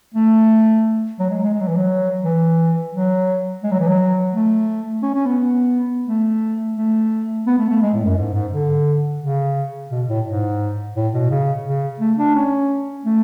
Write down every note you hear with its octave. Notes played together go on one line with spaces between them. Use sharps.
A3
F#3
G#3
G#3
G#3
F#3
E3
F#3
E3
F#3
G#3
F#3
E3
F#3
A3
C#4
C#4
B3
A3
A3
B3
A3
A3
G#3
A2
F#2
G#2
G#2
D3
C#3
B2
A2
G#2
A2
B2
C#3
C#3
A3
D4
C#4
A3